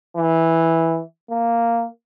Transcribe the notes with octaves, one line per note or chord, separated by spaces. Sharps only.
E3
A#3